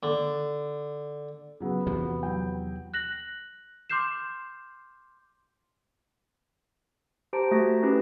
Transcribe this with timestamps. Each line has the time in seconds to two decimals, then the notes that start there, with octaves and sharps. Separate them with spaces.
0.03 D3
1.60 C#3 F#3 B3
1.87 E2 C3 F3 F#4
2.23 F#3 G5
2.94 F#6 A#6 F#7
3.90 C6 D6 F6 G6 C7 E7
7.33 G4 C5 A5 A#5 D7
7.51 A3 F#4 A#6
7.82 A3 C#4 E4 G4 B4